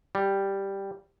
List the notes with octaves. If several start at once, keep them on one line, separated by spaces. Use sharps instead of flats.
G3